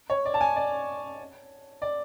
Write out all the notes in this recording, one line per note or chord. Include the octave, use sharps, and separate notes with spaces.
C#5
D5
A5
G#5
D5
D5